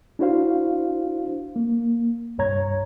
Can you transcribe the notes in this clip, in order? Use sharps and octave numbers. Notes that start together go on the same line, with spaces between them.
D4 E4 F#4 C5 F5
A#3
C2 G2 C#5 A#5 G#6